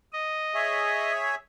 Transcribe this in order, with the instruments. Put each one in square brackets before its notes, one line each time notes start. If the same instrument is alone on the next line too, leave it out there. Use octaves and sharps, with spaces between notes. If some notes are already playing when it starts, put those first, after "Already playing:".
[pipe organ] D#5
[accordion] G#4 C#5 E5